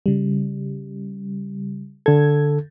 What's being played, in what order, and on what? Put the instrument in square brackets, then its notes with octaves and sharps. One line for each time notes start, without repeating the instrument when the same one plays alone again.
[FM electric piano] C#3 G3
[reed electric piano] D3 A4 [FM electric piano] G#6